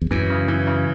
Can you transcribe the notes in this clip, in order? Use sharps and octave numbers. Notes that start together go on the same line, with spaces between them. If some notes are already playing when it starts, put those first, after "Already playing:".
E2
F#2 E3
C#3
E3
C#3